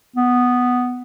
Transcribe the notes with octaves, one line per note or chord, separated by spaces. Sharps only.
B3